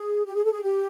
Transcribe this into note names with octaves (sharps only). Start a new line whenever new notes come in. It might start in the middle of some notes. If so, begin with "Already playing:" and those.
Already playing: G#4
G4
G#4
A4
G#4
G4